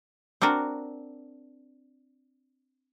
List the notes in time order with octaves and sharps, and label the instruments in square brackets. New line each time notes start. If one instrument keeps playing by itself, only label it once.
[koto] C4 D4 F#4 A#4